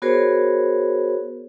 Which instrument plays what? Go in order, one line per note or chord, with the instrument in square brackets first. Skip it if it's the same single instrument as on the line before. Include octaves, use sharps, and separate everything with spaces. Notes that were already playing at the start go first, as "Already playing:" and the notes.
[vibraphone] B3 F#4 G#4 A#4 C5 C#5